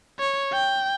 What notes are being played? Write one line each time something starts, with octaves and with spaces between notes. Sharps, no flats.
C#5
G5